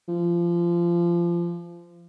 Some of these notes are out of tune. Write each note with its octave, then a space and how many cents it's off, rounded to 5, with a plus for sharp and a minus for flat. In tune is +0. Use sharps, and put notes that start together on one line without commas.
F3 -25